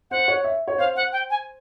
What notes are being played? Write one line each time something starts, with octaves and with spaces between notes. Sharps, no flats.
C5 F#5
C#5
E5
C#5
C5 F5
C5 F#5
G5
G#5